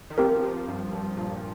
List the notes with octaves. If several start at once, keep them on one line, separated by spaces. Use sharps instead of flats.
D#3
F3 C4 G4 A#4
F3
G2
G2
A#2